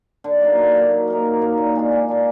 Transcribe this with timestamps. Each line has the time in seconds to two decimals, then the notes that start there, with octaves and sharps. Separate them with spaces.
0.24 D3
0.41 F#3 A#3 D#4
0.57 D3
0.74 F#3 A#3 D#4
0.91 F#3
1.08 A#3 D#4 A#4
1.25 F#3
1.42 A#3 D#4 A#4
1.58 A#2
1.75 G#3 D4 F4
1.92 A#2
2.09 G#3 D4 F4